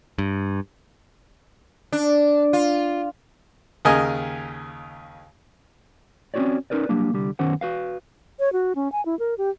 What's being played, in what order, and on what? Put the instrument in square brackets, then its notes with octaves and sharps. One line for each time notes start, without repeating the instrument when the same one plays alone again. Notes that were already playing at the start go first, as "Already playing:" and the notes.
[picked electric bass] G2
[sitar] D4
F4
[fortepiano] D#2 C#3 A#4 D#5 G#5
[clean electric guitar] C4 C#4 F4 F#4 C#5 D5
C#4 D#4 A#4 B4 D5
F#3 G3 A#3 D4
C2 D3 G3
F#2 D#3 B3 C#4 C5 F#5
F#4 B4 F5
[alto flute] C#5
F#4
C#4
G#5
E4
A#4
G4